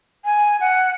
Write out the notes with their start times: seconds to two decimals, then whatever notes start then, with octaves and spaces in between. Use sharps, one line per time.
0.25 G#5
0.60 F#5